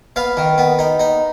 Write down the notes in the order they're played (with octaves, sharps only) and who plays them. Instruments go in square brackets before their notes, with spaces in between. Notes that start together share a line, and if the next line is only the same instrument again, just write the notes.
[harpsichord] B3 F5
D#3
B3
D#4
D#4